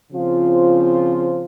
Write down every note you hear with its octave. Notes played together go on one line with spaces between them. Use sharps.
C#3 F3 C4 F4 C5